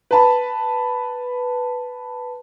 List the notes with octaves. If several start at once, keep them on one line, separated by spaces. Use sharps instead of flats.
B4 A5 B5